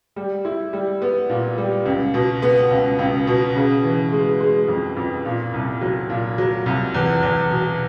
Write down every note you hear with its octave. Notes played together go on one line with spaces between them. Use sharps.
G3
E4
G3
B3
A#2
G3
C#2
B2
B3
C#2
C#2
B2
C#3
E3
G#3
G#3
F2
F2
A#2
C2
F#3
A#2
F#3
C2
E2
E2
B2